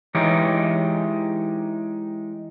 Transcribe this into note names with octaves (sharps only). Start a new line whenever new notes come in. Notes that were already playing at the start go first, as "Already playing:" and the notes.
E3 G#3 D#4 G4 C#5